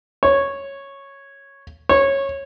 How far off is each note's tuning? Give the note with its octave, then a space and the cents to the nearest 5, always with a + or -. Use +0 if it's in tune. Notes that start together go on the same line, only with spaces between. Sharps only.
C#5 -5
C#5 -15